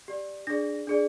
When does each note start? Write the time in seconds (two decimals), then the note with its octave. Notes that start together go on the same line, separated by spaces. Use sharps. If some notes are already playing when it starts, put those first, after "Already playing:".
0.08 G4 D5
0.47 D4 G#4 D5 A#6
0.87 D4 G#4 D5